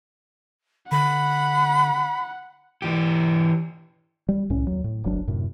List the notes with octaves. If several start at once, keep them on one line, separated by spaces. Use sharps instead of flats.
D3 F#5 B5
E3 G4
G3
C2 A2 C#4
D#2 F#3
A2
D1 G1 F#3 D4
F#2 A2 C3